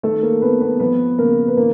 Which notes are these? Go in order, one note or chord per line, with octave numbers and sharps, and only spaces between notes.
D#3 A3 A4
A#3 A#4
B3 C4 B4
B3 B4
F3 B3 B4
C#3 A#3 A#4
B4
D#3 A#3 A#4